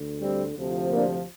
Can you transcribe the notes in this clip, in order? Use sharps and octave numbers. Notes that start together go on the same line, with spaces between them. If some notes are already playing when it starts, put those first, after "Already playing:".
Already playing: D2 D3
G3 C4
D2 C3 F3
A#3 D4